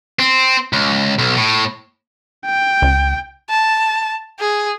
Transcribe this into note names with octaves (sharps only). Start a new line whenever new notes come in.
C4
C#2
B1
A2
G5
C#2
A5
G#4